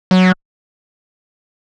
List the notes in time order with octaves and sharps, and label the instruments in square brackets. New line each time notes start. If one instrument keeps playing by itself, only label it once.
[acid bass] F#3